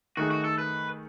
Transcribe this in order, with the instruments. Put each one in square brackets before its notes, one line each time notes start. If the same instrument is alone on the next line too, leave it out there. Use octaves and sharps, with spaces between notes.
[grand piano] D#3 A3 D#4 G#4 [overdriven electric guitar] F#4
[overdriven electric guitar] F#4
A4
B4